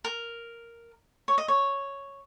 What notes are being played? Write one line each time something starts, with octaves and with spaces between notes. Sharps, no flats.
A#4
C#5
D#5
C#5